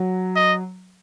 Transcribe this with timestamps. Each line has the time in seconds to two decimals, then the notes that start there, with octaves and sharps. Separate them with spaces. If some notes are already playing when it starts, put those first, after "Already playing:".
Already playing: F#3
0.36 D#5